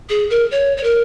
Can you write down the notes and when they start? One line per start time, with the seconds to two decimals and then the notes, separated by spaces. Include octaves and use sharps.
0.09 G#4
0.30 A#4
0.51 C#5
0.77 C#5
0.84 A#4